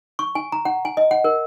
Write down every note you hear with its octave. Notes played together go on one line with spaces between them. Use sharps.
C#6
G#5
A#5
F#5
G#5
D#5
F#5
A#4